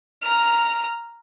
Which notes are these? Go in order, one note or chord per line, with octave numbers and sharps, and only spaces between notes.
A#5 F6